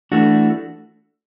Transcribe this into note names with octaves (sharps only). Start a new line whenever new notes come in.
E3 A3 D4 F#4